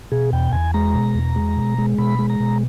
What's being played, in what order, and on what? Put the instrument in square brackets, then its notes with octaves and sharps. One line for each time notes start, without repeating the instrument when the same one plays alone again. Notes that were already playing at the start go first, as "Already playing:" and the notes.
[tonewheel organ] B2 G#4
E2 G5
E2 G#5
G#3 A#5
B2
E2
G#3
B2
G#3
B2 B5
G#3
A#5
B2